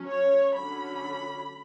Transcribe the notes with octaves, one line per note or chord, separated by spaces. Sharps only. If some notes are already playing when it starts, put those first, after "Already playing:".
Already playing: F#3 C#4
C#5
D3 F#3 C#4 B5